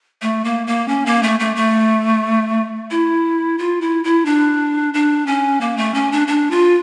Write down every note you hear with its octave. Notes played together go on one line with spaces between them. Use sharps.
A3
A#3
A#3
C#4
A#3
A3
A3
A3
E4
F4
E4
E4
D4
D4
C#4
A#3
A3
C#4
D4
D4
F4